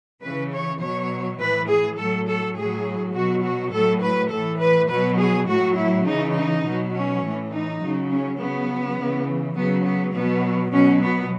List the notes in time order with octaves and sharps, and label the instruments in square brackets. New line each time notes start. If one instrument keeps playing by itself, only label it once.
[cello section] C#3 E3 B4
C#5
B2 F#3 C#5
A2 E3 B4
G#4
A2 F#3 A4
A4
A2 F#3 G#4
B2 F#3 F#4
F#4
A2 F#3 A4
B4
A2 E3 A4
B4
B2 F#3 B4
G#4
A2 F#3 F#4
E4
C#3 E3 D#4
D#4
B2 F#3
C#4
A2 E3
D#4
C#3 F#3
C#4
C#3 F#3 B3
C#3 E3
C#3 F#3 B3
B3
B2 F#3 B3
B2 F#3 C#4
B3